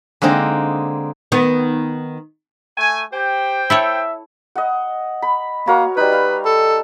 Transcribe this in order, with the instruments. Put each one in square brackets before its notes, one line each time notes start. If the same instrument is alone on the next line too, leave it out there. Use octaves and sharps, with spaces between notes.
[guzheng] D3 G#3 A#3 C4 D#4
[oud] D#3 B3
[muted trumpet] A3 [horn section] G#5
[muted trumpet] G4 [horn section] C5 G5
[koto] E4 A4 C#5 [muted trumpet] E5
[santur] D#5 F#5
B5
[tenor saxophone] A#3 [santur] F#4 A#4 C#5
[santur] G3 D#4 [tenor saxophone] B4
[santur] F5
[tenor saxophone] A4